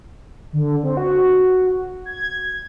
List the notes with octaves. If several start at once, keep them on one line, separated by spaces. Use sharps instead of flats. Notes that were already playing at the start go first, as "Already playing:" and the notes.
D3
C4
F#4
G#6